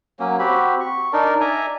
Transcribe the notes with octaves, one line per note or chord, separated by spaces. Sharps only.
F#3 A#3 C#4
C4 F#4 G4 B5
C#6
D4 D#4 A#4 D5
D5 E5 G#5 A#5